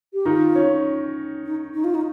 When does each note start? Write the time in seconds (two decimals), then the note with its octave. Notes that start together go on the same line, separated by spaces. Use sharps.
0.14 G4
0.26 D#3 D#4 F4
0.55 C#4 C#5
1.45 D#4
1.74 D#4
1.84 F4
1.95 D#4